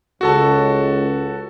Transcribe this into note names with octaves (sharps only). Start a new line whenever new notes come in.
C#2 F#4 A4 A5